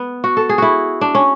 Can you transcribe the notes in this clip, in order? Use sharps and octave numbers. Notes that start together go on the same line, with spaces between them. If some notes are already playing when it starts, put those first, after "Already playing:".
Already playing: B3
F#4
A4
G#4
E4 F#4
D4
C#4